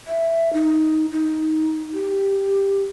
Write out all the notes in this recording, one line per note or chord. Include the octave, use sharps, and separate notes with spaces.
E5
D#4
D#4
G4